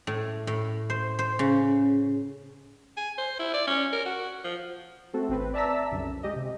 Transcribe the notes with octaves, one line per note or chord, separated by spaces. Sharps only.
A2
A2
C5
C5
C#3
G#5
C5
E4
D5
C#4
A#4
F#4
F3
A3 C4 F#4 A4
G#1 C4 B4
D5 E5 A5 A#5 E6 B6
C2 F#2 D3
G#3 G4 D#5
C3